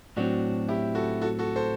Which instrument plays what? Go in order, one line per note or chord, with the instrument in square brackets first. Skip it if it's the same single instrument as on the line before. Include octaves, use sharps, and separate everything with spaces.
[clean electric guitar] A2 F#3 C4 [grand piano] D4 F#4
[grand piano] E4 G4
F#4 A4
F#4 A4
F#4 A4
A4 C5